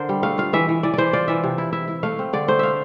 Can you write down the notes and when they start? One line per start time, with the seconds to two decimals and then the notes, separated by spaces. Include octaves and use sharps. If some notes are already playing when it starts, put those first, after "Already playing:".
Already playing: D3 A#4 C5
0.09 G3
0.23 A3 F5
0.38 F4 F5
0.53 E3 E5
0.69 E3
0.83 E3 D5
0.94 E3 C5 D5
1.13 F4 D5
1.28 E3 E5
1.44 C3
1.58 E4
1.73 E4 E5
1.88 E4
2.03 A3 F5
2.19 C4
2.33 D3 D5
2.48 A3 C5
2.59 E5 F5